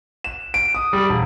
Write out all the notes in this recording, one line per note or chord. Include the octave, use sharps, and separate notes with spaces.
E7
D7
D#6
G3
E1